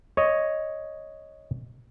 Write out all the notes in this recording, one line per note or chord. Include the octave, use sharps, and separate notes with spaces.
C#5 D#5